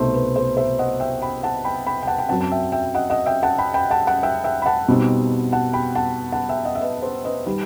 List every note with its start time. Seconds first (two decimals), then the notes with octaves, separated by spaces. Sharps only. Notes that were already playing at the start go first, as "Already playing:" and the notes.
Already playing: C2 B2 A3 D#4 C5
0.14 B4
0.36 C5
0.57 C5 E5
0.79 D#5 F#5
1.00 E5 G5
1.22 G5 B5
1.43 F#5 A5
1.65 G5 B5
1.87 G5 B5
2.03 G5
2.07 F#5 A5
2.18 G5
2.29 C4 F#5 A5
2.32 F#2 F#3
2.41 A5
2.51 E5 G5
2.72 E5 G5
2.94 D#5 F#5
3.10 D#5 F#5
3.26 E5 G5
3.43 F#5 A5
3.58 G5 B5
3.74 G5 B5
3.90 F#5 A5
4.07 F#5 A5
4.23 E5 G5
4.44 E5 G5
4.62 B5
4.66 F#5 A5
4.88 B2 G3 C4 D#4
5.52 F#5 A5
5.73 G5 B5
5.95 F#5 A5
6.32 F#5 A5
6.49 E5 G5
6.65 D#5 F#5
6.75 E5
6.81 B4 D#5
7.02 C5
7.25 B4 D#5
7.46 D#3 G3